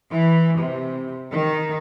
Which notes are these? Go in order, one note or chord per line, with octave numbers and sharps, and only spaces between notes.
E3
C3
D#3